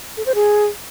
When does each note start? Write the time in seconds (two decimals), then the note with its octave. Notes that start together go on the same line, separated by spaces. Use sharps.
0.17 A4
0.26 C5
0.35 G#4